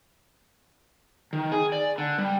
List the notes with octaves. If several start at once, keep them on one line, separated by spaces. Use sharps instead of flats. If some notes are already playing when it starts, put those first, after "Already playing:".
D#3
G#4
D5
D3
G3